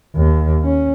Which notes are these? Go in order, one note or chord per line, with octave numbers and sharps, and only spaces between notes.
D#2
C#4